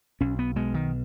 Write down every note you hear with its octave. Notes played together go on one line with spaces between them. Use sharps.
B1 C#4
B3
B2 G#3
D#3